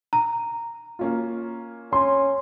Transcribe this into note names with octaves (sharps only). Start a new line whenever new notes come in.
A#5
A#3 C#4 F4
C#4 C6